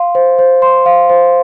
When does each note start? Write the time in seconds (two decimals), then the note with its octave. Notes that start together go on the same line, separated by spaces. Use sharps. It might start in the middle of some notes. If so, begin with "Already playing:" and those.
Already playing: F5 C6
0.15 C5
0.39 C5
0.62 C6
0.86 F5
1.09 C5